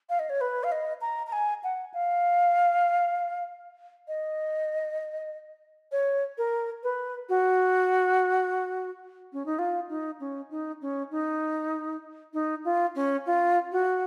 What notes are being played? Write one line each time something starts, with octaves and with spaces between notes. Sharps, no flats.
F5
D#5
C#5
B4
F5
D#5
A#5
A#5
G#5
F#5
F5
D#5
C#5
A#4
B4
F#4
C#4
D#4
F4
D#4
C#4
D#4
C#4
D#4
D#4
F4
C#4
F4
F#4